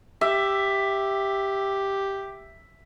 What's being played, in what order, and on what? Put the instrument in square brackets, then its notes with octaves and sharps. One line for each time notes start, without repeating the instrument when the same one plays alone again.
[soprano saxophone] G4 [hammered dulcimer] E5